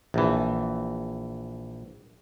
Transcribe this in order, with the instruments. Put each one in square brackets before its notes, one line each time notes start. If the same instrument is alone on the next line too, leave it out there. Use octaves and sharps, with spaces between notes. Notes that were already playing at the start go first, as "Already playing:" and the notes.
[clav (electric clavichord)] A#1 E3